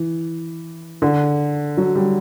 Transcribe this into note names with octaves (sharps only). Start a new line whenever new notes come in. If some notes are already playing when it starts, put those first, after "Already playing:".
Already playing: E3
D3
F#3
G3